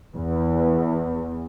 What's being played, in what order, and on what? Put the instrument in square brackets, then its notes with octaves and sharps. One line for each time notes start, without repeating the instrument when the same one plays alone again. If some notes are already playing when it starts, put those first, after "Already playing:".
[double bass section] E2